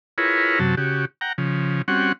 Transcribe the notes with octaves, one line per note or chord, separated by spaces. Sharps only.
E4 F4 G#4 A#4 B4 C#5
F#2 C3 F#3 A5
C#3 F#4 G4
F#5 G5 A#5
C#3 F3
G3 C4 C#4 F#4 F#5